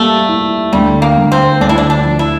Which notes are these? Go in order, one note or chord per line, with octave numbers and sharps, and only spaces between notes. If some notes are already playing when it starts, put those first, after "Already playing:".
Already playing: G3 A3 A#3
E4
D2 G3
A#3
D2
C4
D2 D4
E4
D4
D4
F3
E4